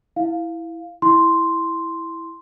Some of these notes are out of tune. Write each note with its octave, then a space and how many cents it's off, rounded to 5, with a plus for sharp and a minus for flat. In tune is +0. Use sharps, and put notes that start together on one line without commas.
E4 +0 F5 +0
E4 +0 C6 +0